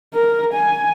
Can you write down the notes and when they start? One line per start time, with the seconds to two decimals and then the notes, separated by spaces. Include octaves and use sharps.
0.14 A#4
0.53 G#5